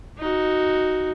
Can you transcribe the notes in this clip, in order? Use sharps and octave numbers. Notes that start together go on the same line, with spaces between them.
D#4 F#4